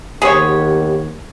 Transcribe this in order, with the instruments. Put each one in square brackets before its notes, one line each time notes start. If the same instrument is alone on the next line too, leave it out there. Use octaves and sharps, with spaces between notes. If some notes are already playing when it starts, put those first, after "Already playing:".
[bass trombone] D#2 [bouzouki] B3 G4 F#5 [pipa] G#4 C5 C#5